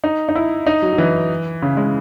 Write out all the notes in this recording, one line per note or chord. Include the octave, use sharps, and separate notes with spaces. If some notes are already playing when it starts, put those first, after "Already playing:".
D#4
D#4
E4
D#4
F#3
F#3
E3
C#3
G#3